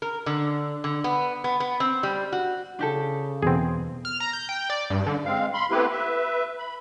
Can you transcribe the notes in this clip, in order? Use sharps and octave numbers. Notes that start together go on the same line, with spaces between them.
A#4
D3
D3
B3
B3
B3
C4
G3
F#4
C#3 D4 G4 A4
E2 B2 B3 C4 G#4
F6
A#5
G6
G5
D5
G2
D3
G#3 C4 F5
B5 C6
A3 B3 C4 E4 G4 B4
B4 E5
B5